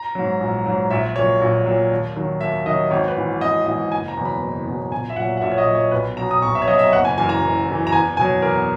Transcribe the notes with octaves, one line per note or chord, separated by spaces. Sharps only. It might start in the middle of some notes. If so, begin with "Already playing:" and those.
Already playing: A#5
G#2 F#3
A#1
G#2 F#3
A#1 E5
A#2 F#3 C#5
A#1
A#2 F#3
D#2
D#3 F#3
D#2 E5
D#3 F#3 D#5
G#1 C#5
B4
G#2 E3
G#1 D#5
G#2 E3 D#5
F#1 G#5
A#5
E2 B2 F#3
B5
F#1
E2 B2 F#3
A#1 G#5
E5
A#2 F#3 F#5
F#5
A#1 E5
C#5
D#5
A#2 F#3
C#5
B1 B4
B2 F#3 A#5
D#6
B1 C#6
E5
C#5
B2 F#3 D#5
E5
F#1 F#5
G#5
F#2 E3 G#5
A#5
F#1
F#2 E3
A#5
E2 G#5
B2 F#3 G#5
E2 A#4